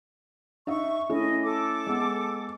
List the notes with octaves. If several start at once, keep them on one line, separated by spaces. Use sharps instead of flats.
D#4 E5 C#6
A3 C#4 E4 D#5
A4 D6
G#3 B3